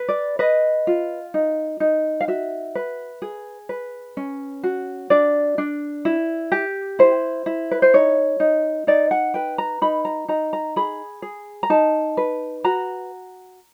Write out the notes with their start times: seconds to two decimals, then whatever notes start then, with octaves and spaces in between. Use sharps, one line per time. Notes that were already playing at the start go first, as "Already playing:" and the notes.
Already playing: B4
0.09 D5
0.39 B4 D#5
0.87 F4
1.34 D#4
1.80 D#4
2.21 F5
2.28 F#4 E5
2.75 B4
3.22 G#4
3.69 B4
4.17 C#4
4.63 F#4
5.10 D4 D5
5.58 D4
6.05 E4
6.52 G4
6.99 E4 C5
7.46 E4
7.71 B4
7.82 C5
7.94 D#4 C#5
8.40 D#4
8.87 D#4 D5
9.11 F#5
9.34 B4 G5
9.58 A#5
9.82 D#4 B5
10.05 A#5
10.28 D#4 A#5
10.53 A#5
10.76 G#4 B5
11.22 G#4
11.63 A#5
11.70 D#4 A5
12.17 B4
12.64 F#4 A#5